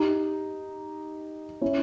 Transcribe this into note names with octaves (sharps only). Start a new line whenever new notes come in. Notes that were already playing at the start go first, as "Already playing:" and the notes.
Already playing: D#4 G4
C#4 E4